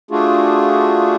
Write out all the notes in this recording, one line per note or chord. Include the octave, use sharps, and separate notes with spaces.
A3 D4 F4 F#4 G#4